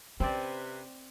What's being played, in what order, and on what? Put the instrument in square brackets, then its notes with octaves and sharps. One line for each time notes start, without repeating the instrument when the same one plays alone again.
[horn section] C3 B4 [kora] C4 D5 [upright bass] C#4